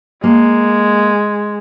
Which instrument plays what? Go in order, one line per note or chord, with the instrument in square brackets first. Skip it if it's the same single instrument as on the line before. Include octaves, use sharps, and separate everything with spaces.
[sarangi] G#3 [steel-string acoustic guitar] A#3